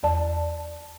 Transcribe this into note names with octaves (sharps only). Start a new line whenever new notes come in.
E2 D5 A5